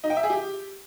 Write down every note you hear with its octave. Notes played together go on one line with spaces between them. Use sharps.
D#4
G5
E5
G#4
G4